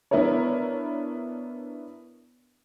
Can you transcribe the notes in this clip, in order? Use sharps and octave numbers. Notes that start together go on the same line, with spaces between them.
B3 D4 E4 A#4 C#5